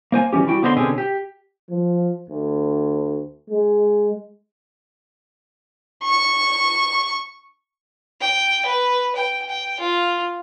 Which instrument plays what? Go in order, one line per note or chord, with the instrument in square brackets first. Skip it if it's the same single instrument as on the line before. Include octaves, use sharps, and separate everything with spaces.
[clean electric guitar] A#3 C5 G#5
E3 G3 C#4 G4
G3 E4 F#4 G5
D3 B3 C5 D#5 E5 C6
B2 D3 C4 C#4 G4 G#4
G4
[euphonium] F3
D2
G#3
[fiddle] C#6
[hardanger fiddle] G5
B4
G5
G5
F4